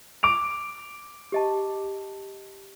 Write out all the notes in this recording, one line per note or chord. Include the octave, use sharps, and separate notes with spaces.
D6 D7 F7
G4 D#5 A5